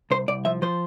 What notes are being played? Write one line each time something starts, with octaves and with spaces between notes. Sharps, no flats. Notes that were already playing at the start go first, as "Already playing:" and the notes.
C2 C5
C2 D5
F3 E5
F3 C5